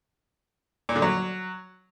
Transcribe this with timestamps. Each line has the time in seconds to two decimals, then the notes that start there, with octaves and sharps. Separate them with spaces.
0.89 A#2
0.96 D3
1.02 F#3